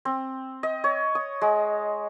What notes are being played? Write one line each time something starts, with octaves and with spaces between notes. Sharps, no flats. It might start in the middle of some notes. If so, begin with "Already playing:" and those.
C4
D#5
C#5
D#6
G#3